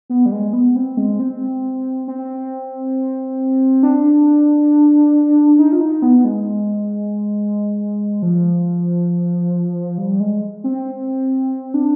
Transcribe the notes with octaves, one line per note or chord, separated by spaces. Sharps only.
B3
G3
G#3
B3
C4
G#3
C4
C4
D4
D#4
F4
D#4
B3
G#3
F3
G3
G#3
C4
D4